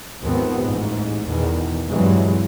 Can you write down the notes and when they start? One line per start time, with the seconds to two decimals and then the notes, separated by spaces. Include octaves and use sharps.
0.22 D#2 G#2 F3 B3 C4
0.60 A1 G#2
1.27 E2 B2 D#3
1.89 G2 C3 E3 F#3 G#3